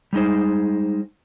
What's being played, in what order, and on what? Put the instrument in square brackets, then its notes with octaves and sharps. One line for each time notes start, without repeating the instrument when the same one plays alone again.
[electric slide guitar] G3 G#3 D#4 C5